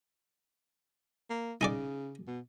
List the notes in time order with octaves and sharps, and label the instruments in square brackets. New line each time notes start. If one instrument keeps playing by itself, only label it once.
[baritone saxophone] A#3
[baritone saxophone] C#3 [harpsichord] D#4 G#4 D5
[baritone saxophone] B2